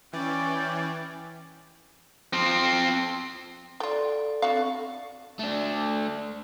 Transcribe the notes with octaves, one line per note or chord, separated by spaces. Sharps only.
E3 C#4 D5 G5
F3 C4
F4 G4 A4 D5
D3 C4 F#4 A4 F5 C#6
A3 D4